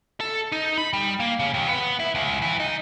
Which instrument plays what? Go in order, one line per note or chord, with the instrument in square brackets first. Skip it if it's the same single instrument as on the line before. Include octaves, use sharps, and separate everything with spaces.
[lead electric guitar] A4
D#4
B5
G3
A#3
C#3
D#2
B3
E4
C#2
E3
D#4